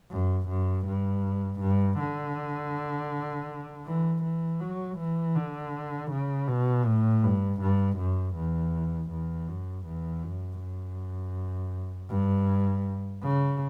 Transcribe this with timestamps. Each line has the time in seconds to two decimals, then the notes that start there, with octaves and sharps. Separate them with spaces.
0.11 F#2
0.49 F#2
0.86 G2
1.60 G2
1.99 D3
3.86 E3
4.23 E3
4.60 F#3
4.98 E3
5.35 D3
6.11 C#3
6.47 B2
6.86 A2
7.23 G2
7.61 G2
7.97 F#2
8.36 E2
9.10 E2
9.48 F#2
9.86 E2
10.23 F#2
10.61 F#2
12.10 G2
13.23 C#3